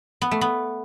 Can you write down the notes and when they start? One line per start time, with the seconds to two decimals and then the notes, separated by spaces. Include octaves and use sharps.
0.21 B3
0.31 A3
0.41 B3